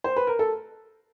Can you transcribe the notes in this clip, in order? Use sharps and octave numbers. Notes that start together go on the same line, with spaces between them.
C5
B4
A#4
A4